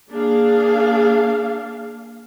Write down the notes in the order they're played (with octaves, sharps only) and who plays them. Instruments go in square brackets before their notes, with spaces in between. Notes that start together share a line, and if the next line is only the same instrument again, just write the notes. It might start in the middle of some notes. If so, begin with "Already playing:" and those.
[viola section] A#3 D4 G#4 F5